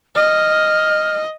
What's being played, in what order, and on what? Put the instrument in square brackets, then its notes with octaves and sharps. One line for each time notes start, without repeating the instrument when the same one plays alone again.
[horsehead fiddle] D#5 [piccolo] F6